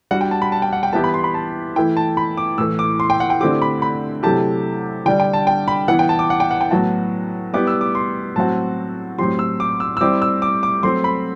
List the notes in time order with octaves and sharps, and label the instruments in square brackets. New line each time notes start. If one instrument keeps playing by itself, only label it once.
[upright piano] G3 D4 F#4 [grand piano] F#5
[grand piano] G5
A5
B5
A5
G5
F#5
G5
[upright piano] E3 B3 E4 G4 [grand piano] A5
[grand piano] B5
C6
B5
A5
[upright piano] E3 A3 E4 [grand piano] G5
[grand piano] A5
B5
D6
[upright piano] A2 E3 A3 [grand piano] E6
[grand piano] D6
C6
G5
F#5
G5
[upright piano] D3 A3 C4 E4 G4 [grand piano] D6
[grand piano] B5
B5
[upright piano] C3 F#3 A3 E4 G4 [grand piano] A5
[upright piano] D3 G3 D4 [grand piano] G5
[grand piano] G5
A5
G5
B5
[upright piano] E3 B3 E4 [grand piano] F#5
[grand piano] G5
A5
D6
F#5
G5
F#5
G5
[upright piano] A2 F#3 B3 F#4 [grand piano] A5
[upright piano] G3 B3 E4 G4 [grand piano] D6
[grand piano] E6
D6
C6
[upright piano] A2 F#3 C4 F#4 [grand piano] A5
[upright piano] A2 F#3 C4 G4 [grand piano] C6
[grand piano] E6
D6
E6
E6
[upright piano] G3 C4 E4 G4 [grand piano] D6
[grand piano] E6
D6
D6
[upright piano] F#3 A3 C4 [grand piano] C6
[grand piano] B5